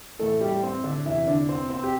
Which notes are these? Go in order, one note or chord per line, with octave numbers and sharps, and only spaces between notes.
A2 E3 A3 A4
G3 G4
C4
D3 D4
E2 C3 E3 E4
D3 D4
C4
C4
G4